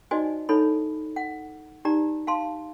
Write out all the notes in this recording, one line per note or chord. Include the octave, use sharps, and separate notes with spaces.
D#4 F#4 C5 D5 D#5 G#5
D#4 E4 A4 C5 C#5 B5
F#5
D#4 G4 D5 A#5
F5 A5 C6